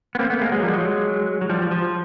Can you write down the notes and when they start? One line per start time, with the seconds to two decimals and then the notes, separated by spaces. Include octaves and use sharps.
0.15 B3
0.19 A#3 C4
0.30 A3 B3
0.41 G#3 A#3
0.52 F#3 G#3
0.63 F3 G3
0.74 F#3 G#3
1.41 F#3
1.49 F3 G3
1.60 F3
1.71 F3